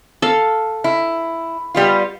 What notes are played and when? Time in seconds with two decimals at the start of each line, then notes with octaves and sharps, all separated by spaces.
0.22 A4 F5
0.84 E4
1.75 G3 B3 F4